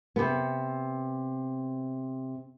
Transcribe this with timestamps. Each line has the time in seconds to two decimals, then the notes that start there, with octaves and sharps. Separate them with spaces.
0.16 C3 B3